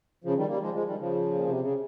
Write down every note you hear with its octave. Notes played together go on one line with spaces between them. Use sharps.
C#3 F3
D#3 G3
G3 A#3
F3 G#3
F3 G#3
D#3 G3
C#3 F3
A#2
C3
C#3